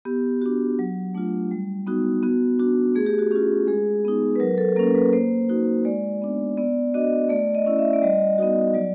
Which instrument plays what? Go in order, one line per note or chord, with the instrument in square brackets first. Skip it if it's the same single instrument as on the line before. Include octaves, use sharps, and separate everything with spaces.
[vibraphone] B3 G4
D4 F#4
F#3
A3 D4 F4
G3
B3 D#4 F#4
B3 F#4
D4 F#4
A3 G#4
G4
F#4
C#4 F4 G4
G#3 G#4
B3 D#4
B4
F#3 A#4
A4
A#3 C#4 A#4
B4
A#3 C5
D#4 F#4
G#3 D5
B3 D4
B3 D5
D4 F#4 D#5
A3 D5
D#5
C#4 E4
E5
D5
G3 D#5
B3 D#4 F#4
F#3 D5